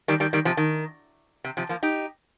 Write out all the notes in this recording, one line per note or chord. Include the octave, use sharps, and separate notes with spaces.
D#3 G3
D#3 G3
D#3 G3
C3 F3
D#3
C3
C3 F3
F3 A#3
D#4 G4